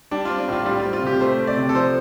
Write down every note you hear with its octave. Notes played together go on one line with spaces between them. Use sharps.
G3 D4
C4 F4
D4
A2 F4
G3 F4
F4
C4
F4
C3 G4
A3 C5
C4
D5
C3
A4
F3 C5